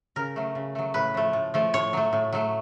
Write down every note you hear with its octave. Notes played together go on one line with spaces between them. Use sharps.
C#3 A#4
F#3 A3
C#3
F#3 A3
A2 B4
F3 A3
A2
F3 A3
A2 C#5
F#3 A3
A2
F#3 A3